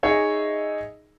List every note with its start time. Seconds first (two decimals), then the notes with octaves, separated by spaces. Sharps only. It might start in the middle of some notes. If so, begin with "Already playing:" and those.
0.03 D#4 G#4 C#5 D#5 E5